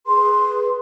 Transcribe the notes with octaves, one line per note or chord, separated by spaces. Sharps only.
G#4 B4 C6